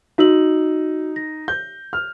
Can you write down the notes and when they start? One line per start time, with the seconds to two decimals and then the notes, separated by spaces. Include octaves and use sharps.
0.18 D#4 F#4 E6 F#7
1.16 A#6
1.48 G6
1.93 F6